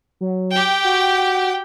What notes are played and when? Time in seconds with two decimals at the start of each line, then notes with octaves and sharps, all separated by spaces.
0.21 F#3
0.51 G4 G5
0.84 F#4